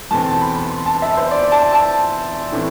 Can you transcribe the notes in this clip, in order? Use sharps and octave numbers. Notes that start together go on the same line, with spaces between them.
E2 B2 A3 C4 A5
B5
C6
A5
E5
C5
D5
A5
A5
A2 E3 A3 C4